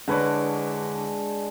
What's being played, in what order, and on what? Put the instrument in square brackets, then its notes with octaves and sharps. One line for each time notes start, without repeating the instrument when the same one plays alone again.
[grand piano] D3 B4 C#5 [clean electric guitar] G#3 D4